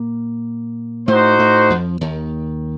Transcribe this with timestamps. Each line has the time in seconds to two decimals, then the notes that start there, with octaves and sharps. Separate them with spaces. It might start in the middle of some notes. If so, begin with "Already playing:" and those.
Already playing: A#2 A#3
1.08 A2 A3 D#4 F#4 C5
1.39 A2 A3
1.70 F2 F3
2.01 D#2 D#3